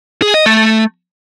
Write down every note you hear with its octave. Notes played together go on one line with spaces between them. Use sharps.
G#4
D#5
A3